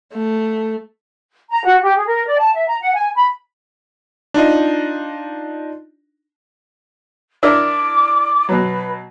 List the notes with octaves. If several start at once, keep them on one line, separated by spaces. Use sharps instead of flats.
A3
A#5
F#4
G4
G#4
A#4
D5
A5
E5
A#5
F#5
G#5
B5
D4 D#4 F4 D#5
D4 E4 A#4 D6
B2 F#3 B4